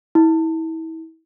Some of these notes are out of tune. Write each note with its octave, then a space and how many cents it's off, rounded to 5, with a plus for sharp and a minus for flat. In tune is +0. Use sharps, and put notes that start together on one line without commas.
E4 -35